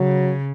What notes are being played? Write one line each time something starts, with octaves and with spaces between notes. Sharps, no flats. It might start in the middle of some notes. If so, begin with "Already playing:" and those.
Already playing: C#3 F#3